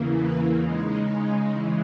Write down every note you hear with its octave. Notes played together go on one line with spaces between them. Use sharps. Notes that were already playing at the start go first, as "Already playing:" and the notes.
Already playing: E2 C#3 E3 A#3
B4
C#3 G#3 D#4
C#3 E3 G#3